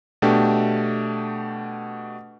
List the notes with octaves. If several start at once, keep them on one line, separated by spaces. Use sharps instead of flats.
B2 A3 D4 G4